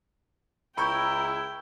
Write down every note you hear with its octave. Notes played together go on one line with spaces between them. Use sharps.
C#2 E4 G5 A#5 B5 C#6 G6